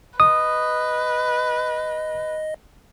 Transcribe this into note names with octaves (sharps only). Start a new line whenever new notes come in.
B4 D#5 D#6